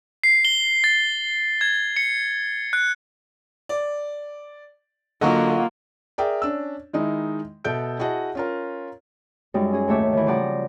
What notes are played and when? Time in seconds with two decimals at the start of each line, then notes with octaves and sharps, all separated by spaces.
0.24 C7
0.45 G7
0.84 A6
1.61 G#6
1.97 C#7
2.73 F#6
3.69 D5
5.21 D3 F#3 A#3 F4 D#5 F#5 C#6
6.18 G#4 A#4 D5 E5 G5
6.42 C#4 D4 E6
6.93 D#3 G#3 D#4 E4
7.64 B2 A4 E5 G6 D7
7.99 E4 F#4 G#4 D#5 F#5 A5
8.35 C#4 F4 A#4
9.54 F#2 G3 G#3 D#4
9.73 C#4 G#4
9.88 D#2 G#2 A3 C#5 E5 D6
10.13 D#3 E3
10.26 C#3 F3 G3 D5 F#5 A#5